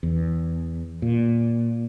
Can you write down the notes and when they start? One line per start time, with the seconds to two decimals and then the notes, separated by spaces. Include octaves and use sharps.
0.03 E2
1.02 A#2